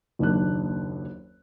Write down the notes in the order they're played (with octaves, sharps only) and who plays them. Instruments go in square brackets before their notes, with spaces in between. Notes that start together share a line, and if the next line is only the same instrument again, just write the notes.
[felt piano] F#1 D#2 D4 F#6